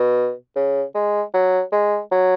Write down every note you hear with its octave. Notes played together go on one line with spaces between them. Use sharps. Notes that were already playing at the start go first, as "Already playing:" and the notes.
Already playing: B2
C#3
G#3
F#3
G#3
F#3